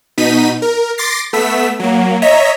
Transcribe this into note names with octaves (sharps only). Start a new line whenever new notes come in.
B2 D#4 B6 D#7
A#4
C6 D6 A6 A#6 C7
A3 B3 E6 B6
F#3 A#3
C#5 D#5 E5 A#5 B6